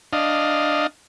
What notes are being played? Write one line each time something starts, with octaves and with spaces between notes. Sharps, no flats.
D4 D#5 F5